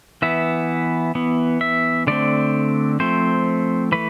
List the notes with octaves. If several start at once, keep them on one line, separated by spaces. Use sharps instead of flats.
E3 B3 E5
E3 B3
E5
D3 A3 C4 D5
F3 A3 C4 C5
E3 A3 B4